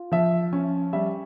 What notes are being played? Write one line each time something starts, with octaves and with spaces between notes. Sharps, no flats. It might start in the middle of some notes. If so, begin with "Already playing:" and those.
Already playing: F4
F3 E5
C#4
G3 E5